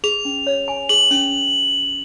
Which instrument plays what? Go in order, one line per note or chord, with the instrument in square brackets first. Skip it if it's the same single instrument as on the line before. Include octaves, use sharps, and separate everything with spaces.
[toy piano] G#4 [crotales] F7
[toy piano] C#4
C#5
G#5
[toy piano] G#4 [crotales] F#7
[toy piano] C#4